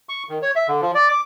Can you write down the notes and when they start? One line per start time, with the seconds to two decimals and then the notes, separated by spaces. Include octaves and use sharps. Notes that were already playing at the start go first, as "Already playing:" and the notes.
0.09 C#6
0.29 D#3
0.42 C#5
0.56 E5
0.68 D3
0.82 F3
0.95 D5
1.09 D6